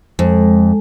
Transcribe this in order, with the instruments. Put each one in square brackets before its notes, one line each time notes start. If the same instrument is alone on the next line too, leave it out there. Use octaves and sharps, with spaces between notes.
[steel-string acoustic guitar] F2 [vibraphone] G#3